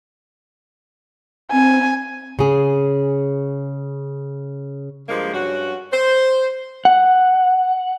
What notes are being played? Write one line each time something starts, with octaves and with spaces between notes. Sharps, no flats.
C4 G#5
C#3 G#4
G2 F3 G#3 A#3
G2 C#4 F#4
C5
F#5